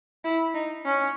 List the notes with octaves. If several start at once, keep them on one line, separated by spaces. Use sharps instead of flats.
E4
D#4
C#4